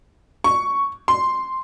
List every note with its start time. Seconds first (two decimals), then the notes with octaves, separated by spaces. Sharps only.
0.44 C#6
1.08 C6